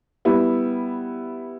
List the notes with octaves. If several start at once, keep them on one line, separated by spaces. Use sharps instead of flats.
G3 B3 E4